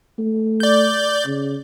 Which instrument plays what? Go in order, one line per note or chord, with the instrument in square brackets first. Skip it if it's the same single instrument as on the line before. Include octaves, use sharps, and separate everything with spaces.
[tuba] A3
[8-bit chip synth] D5 G6
[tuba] C#3